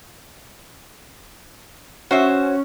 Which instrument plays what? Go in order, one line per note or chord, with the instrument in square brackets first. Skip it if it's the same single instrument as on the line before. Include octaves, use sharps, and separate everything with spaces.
[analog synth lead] C#4 [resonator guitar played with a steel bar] F#4 C5 E5